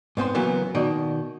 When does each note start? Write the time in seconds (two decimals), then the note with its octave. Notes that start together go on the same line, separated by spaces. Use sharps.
0.17 G#2 B3 C4 C6
0.35 C#3 E3 F#3 A#3 B3
0.75 B2 D#3 D5 D#5